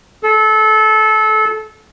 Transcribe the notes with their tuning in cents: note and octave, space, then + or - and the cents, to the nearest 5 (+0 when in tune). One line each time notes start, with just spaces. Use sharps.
A4 -25